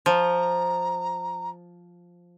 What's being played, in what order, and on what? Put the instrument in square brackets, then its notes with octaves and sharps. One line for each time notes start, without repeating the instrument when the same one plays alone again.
[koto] F3 [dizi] A#5